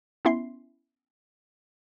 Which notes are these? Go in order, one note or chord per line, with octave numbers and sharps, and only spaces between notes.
B3 C#4 E4 E5 C6 C7